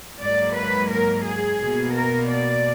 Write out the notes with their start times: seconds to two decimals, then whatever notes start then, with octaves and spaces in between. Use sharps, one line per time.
0.21 G#2 F#3 A#3 D5
0.56 B4
0.91 A#4
1.26 G#4
1.61 B2 A#3
1.94 A#4
2.29 D5